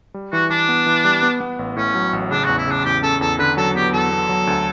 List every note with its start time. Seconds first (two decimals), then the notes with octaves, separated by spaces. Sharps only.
0.14 G3
0.33 E3 F#4
0.50 E3 D4
0.69 B3
0.86 E3
1.05 G3
1.22 B3
1.40 B3
1.59 A1
1.76 A2 C#4
1.95 F#3
2.13 A1
2.31 C#3 D4
2.44 F#4
2.49 E2
2.58 E4
2.67 C#3 D4
2.85 E2 G4
3.03 C#4 A4
3.21 E2 A4
3.39 D3 B4
3.57 F#3 A4
3.75 B3 G4
3.93 E2 A4
4.11 B3
4.29 F#3
4.47 D2